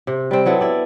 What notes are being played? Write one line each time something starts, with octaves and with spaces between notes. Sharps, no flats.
C3
G3 C4
F#3 B3 E4 A4
E4 D5